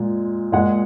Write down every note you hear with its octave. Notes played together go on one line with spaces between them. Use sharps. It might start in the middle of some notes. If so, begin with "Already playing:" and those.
Already playing: A#2 G#3
A#2 G#3 D#5 F#5